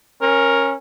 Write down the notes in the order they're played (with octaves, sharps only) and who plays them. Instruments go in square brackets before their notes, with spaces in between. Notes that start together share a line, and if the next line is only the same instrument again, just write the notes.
[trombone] C#4 [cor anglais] A#4